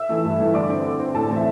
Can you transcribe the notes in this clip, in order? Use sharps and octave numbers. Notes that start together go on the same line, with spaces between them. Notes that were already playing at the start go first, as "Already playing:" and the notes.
Already playing: E5 E6
E3 A3
G2
E3 A3
D3 D5 D6
C4
D3
C4
A2 A4 A5
E3 C4
E5